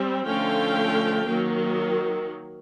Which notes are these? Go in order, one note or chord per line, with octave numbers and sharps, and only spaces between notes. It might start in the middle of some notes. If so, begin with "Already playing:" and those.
Already playing: G3 C4
D3 F3 A3 C#4 F5 G5
D#3 F#3 A#3